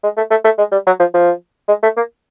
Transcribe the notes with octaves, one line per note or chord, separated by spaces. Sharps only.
G#3
A3
A3
A3
G#3
G3
F#3
F3
F3
G#3
A3
A#3